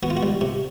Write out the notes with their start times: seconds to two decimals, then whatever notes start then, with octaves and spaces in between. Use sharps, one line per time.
0.03 B3 F#4
0.10 F4
0.17 F#4
0.23 G3
0.41 C3